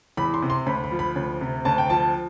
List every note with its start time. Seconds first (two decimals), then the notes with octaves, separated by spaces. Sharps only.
0.17 E2 B5
0.34 C6
0.42 C3
0.50 C6
0.66 D2 B5
0.84 B5
0.92 F3
0.99 B5
1.16 D2
1.41 C3
1.65 D2 A5
1.78 G5
1.90 F3 A5